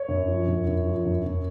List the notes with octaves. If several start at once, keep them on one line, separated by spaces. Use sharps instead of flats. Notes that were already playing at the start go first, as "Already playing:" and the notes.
Already playing: C#5
F#2
F3
F#2
F#2
F3
F#2
F#2